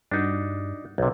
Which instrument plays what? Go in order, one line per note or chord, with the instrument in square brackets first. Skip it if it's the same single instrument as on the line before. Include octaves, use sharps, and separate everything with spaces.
[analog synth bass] G2 [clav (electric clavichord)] D4 D#4 F#4
[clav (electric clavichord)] B1 C3